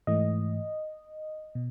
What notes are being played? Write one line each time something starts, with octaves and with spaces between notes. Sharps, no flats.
G#2 E3 A3 D#5
B2